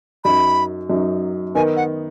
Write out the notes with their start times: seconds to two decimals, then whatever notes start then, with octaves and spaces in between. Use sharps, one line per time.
0.24 F#2 F#3 D#4 B5
0.90 F#2 F#3 D#4
1.55 D#3 B3 D#4 G#5
1.76 F#5